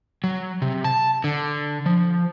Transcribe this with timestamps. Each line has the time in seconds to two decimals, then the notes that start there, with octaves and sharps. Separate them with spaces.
0.24 F#3
0.62 C3
0.84 A5
1.24 D3
1.86 F3